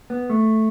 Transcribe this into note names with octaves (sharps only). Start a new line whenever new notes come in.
B3
A3